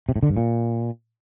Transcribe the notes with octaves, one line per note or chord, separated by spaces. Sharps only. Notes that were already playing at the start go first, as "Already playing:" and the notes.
C3
A2
D3
G2
A#2